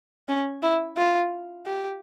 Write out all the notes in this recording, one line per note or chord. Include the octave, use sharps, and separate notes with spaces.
C#4
E4
F4
G4